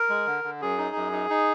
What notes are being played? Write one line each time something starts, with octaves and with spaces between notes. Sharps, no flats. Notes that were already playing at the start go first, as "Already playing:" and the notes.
Already playing: A#4
G#3
D3
D3
F#2 G#4
D#4
F#2
D#4
D#4